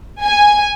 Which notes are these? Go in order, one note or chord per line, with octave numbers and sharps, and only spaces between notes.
G#5